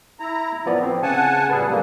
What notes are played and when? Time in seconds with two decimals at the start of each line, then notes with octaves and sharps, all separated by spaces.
0.20 E4 A#5
0.66 A2 F3 B3 D5
0.83 C4
1.03 C#3 F#5 G#5 A5
1.49 F2 A2 G3 G#4 B4
1.69 D3 G3 A#3